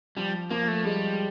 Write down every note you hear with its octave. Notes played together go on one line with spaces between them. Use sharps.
F3 G3
F3 A#3
A3
G3 G#3